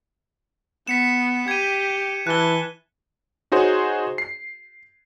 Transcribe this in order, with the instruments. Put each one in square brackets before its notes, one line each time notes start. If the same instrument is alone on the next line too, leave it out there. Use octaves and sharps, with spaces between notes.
[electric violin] B3 [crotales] B6 C#7 E7
[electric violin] G4 [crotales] G#6 D#7
[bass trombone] E3 [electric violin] A5 [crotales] F#6 G7
[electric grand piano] D#4 F#4 G#4 C5 C#5
C7